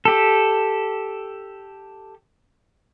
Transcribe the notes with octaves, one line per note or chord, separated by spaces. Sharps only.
G4 A4